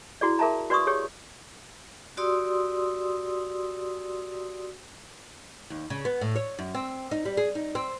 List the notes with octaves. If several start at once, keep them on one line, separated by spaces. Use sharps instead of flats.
E4 F#4 G#4 D5
G#4 A#4 E5 A5 A#5
F#4 B4 D5 C6 C#6 D#6
G4 G#4 C#5
F#4 G4 D5 C6 D#6 E6
D#2
C#3
B3
A2
C#5
F#2
C4
D#4
G3
G#4
D#4
C4